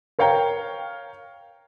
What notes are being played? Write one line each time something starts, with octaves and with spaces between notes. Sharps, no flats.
A#4 C#5 F5 G5 A#5